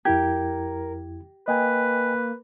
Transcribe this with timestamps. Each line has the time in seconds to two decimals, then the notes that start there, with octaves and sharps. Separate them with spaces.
0.05 F2 E4 G4 A#4 G#6
1.48 A#3 B4 D#5 G5 G#5